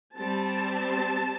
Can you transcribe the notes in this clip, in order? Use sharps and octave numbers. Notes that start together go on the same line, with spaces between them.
G3 C4 A5